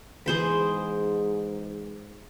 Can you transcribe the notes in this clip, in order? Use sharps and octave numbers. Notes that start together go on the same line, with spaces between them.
E2 G#2 G#4 C5 B5